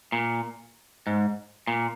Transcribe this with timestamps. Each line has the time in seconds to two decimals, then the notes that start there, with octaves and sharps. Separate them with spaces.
0.12 A#2
1.07 G#2
1.67 A#2